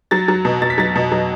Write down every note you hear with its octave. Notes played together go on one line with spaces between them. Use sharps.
F#3 A6
F#3
B2
B2 A6
B6
F#3 A6
B2
F#3